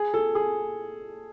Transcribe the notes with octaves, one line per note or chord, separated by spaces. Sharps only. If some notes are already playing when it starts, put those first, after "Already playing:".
Already playing: G#4
A4
G#4